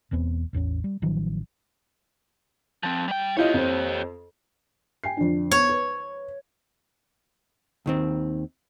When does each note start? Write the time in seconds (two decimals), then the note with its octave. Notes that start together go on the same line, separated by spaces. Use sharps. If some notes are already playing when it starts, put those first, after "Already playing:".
0.11 E1 E2 B3 C4
0.53 A1 E2 C4 C#4
0.84 G3
1.02 A1 D#3 F3 F#3
2.83 F3 C4
3.08 G3 G5
3.37 E4 F4 G4 C#5 D#5
3.54 F2 C5
5.04 G5 G#5 C7
5.17 F2 D3 D4
5.51 B3 C#5
5.69 B4
7.86 D#2 D#3 C4